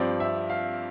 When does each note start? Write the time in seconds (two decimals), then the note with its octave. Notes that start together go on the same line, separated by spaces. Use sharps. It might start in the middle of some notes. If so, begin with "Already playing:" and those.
Already playing: G2 F3 C4 D5
0.20 E5
0.50 F5